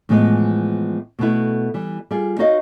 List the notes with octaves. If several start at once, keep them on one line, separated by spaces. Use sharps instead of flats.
A2 E3 F3 G#3 B3
B2 A3 B3 E4
E3 G3
G3 F4 G#4
D#4 F#4 C#5 D#5 F5